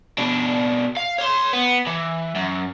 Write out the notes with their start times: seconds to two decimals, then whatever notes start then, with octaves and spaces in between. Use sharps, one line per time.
0.18 B2 D4
0.97 F5
1.18 C#5 C6
1.53 B3
1.87 E3
2.35 F#2